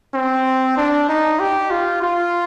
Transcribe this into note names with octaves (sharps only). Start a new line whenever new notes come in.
C4
D4
D#4
G4
F4
F4